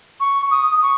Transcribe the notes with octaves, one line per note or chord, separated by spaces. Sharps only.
C#6
D#6
C#6